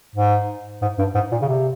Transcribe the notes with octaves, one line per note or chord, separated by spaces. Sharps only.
G#2
G#2
G2
G#2
A#2
C#3
C3